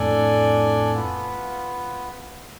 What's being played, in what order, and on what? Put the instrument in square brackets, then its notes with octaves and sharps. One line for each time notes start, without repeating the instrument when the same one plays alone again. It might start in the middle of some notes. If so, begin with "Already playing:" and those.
Already playing: [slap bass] F2 A2 [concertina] D4 A4 D5 G#5
[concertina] B3 F4 B4